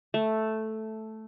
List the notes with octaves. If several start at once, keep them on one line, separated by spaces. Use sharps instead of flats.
A3